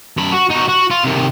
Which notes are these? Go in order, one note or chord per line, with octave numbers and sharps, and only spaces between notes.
F#2 B5
F#4
D#4 F#4
F#4
F4
C3 D#3